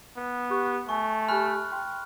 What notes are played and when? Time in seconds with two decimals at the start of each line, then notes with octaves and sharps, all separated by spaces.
0.17 B3
0.50 G4 C#6 F#6
0.89 A3 G#5 C#6
1.28 G4 G#5 B5 F6 F#6
1.72 G5 C6